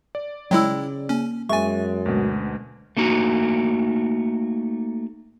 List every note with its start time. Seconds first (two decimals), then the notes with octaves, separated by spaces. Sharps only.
0.15 D5
0.51 C#3 F#3 G#3 E4 G5 E6
1.09 A#3 C#4
1.49 F#2 G#3 E5 G#5 C#6 A6
2.06 D2 B2 G#3
2.97 A3 A#3 D#4 F#4